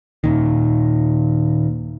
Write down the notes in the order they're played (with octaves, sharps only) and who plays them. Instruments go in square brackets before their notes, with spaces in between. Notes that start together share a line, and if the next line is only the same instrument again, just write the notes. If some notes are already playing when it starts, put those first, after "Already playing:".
[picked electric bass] D#2 A#2 D#3